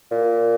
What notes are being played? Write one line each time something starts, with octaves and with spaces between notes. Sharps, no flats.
A#2